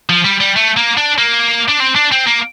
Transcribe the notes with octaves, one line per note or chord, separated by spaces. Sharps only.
F3
G3
G3
A3
A#3
D4
A#3
D4
C4
D4
C4
A#3